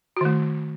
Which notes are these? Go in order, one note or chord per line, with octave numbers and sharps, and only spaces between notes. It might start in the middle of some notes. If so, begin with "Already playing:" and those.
D#3 A3 F#4